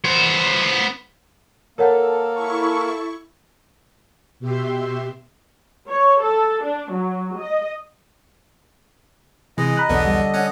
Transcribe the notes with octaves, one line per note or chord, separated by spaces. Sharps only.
B3 C5
A#3 A4 A#4 C#5 F#5
E4 C#6
B2 G4 E5 C6
C#5
A4
D4
F#3
D#5
C3 E3 G#3 D#5
A#5 B5 F#6
B1 E2 D3 B3
G3
C#4 F#5